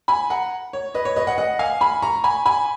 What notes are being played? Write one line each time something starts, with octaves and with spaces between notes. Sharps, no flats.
G#5 B5
F#5 A#5
C#5
B4 D#5
C#5
B4 D#5
D#5 F#5
D#5 F#5
F5 G#5
G#5 B5
A#5 C#6
G#5 B5
G#5 B5